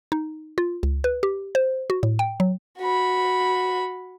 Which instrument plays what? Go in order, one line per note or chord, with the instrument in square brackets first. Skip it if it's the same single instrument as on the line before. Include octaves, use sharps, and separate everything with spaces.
[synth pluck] D#4
F4
C#2
B4
G4
C5
F#4
A2
G5
F#3
[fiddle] F#4 B5